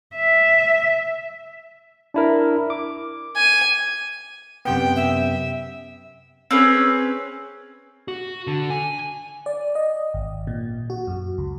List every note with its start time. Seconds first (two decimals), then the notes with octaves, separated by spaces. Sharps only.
0.15 E5
2.14 D4 E4 A#4
2.70 D6
3.36 G#5
4.65 F#2 C3 B3 G5
4.96 E5
6.51 C4 C#4 G#4 B4
8.08 F#4
8.47 D3
8.70 G#5
9.46 D5
9.75 D#5
10.14 G#1
10.47 A#2
10.90 F#4
11.07 F#2
11.38 C#2